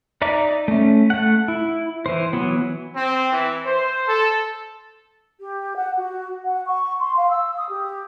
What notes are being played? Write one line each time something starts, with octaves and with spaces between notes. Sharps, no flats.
D#4 D5 E5 A#5 D6
A3 C#4
A3 F#5
E4
E3 C5
E3 F#3 B3
C4
E3
C5
A4
G4
F#5
F#4
F#5
C#6
C6
F5
E6
D#6
G4